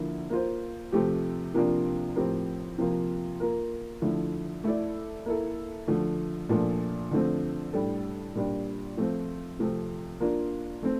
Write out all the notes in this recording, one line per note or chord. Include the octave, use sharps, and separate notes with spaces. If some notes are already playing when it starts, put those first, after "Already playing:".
Already playing: D3 F3 A#3 E4
A#3 F4 C5
C3 F3 A3 C4 G4
C3 F3 A#3 D4 F4
A2 F3 C4 G4 A#4
C3 F3 A#3 F4
A#3 F4 A#4
D3 F3 A3 E4
A3 E4 A4 D5
A#3 E4 A4
D3 F3 A3
A#2 F3 A3 D4
D3 F3 A3 C4
A2 G3 D4 A4
A#2 G3 D4
F3 A3 C4 F4
C3 F3 A3 C4
A#3 D4 F4
A3 C4